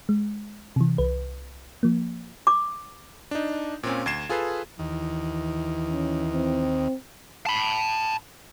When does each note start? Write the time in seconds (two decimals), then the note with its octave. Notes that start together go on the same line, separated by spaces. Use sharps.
0.09 G#3
0.76 C3 E3
0.98 C2 B4
1.83 F3 A#3
2.47 D6
3.31 D4 D#4
3.83 A#2 C4 C#4
4.06 D2 G#6 C7 E7
4.29 F4 G#4 A4 B4
4.79 D#2 E3
5.88 C#4
6.33 C4
7.46 A5 B5